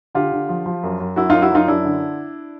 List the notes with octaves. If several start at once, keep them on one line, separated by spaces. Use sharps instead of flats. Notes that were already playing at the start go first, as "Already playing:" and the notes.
D3 F4 G4
D3
F3
F3
F#2
F#2
F#2 E4 F#4
F#2 D#4 F4
E4 F#4
F#2 D#4 F4
F#2 D4 E4
D3